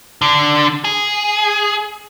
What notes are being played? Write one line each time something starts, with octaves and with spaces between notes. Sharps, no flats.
D3
G#4